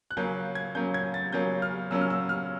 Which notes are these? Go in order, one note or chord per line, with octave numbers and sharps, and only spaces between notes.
F#6
C#3 F#3 A#3 C#4 G6
G#6
C#3 F#3 A#3 C#4 G6
G#6
A6
C#3 F#3 A#3 C#4 G6
F6
C#3 F#3 A#3 C#4 E6
F6
E6
F6